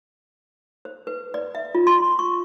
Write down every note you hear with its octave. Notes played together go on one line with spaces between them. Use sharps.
C5
B4
D5
E5
F4
C6
C#6